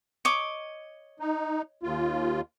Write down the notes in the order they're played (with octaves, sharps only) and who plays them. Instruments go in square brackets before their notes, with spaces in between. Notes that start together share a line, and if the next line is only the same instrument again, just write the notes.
[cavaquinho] C#5 D#5 D6
[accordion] D#4
D#2 F4